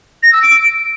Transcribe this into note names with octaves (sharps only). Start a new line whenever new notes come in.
A#6
E6
D7